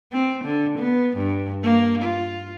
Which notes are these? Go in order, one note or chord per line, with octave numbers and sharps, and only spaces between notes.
C4
D3
B3
G2
A#3
F4